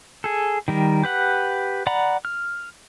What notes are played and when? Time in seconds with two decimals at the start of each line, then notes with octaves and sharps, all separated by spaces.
0.24 G#4 A4
0.68 D#3 G3 A#4
1.03 G4 B4 F#5
1.87 D5 F#5 A#5 B5
2.25 F6